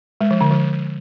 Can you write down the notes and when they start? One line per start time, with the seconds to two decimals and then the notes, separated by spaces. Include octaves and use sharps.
0.21 G#3
0.31 F3
0.41 D3
0.51 F3